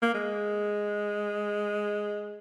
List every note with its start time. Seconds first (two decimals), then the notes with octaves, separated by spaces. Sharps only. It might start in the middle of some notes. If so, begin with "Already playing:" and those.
0.02 A#3
0.15 G#3